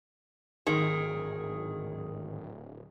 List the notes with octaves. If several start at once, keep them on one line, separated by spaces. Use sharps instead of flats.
D1 G#1 D#3 G#4